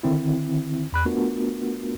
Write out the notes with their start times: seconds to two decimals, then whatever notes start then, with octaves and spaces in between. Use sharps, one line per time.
0.03 D3 D#3 C4 E4
0.92 E2 B5 F#6
1.05 A3 B3 D4 F4 F#4 A#4